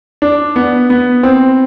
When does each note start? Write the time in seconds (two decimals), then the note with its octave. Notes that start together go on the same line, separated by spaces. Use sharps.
0.22 D4
0.56 B3
0.90 B3
1.23 C4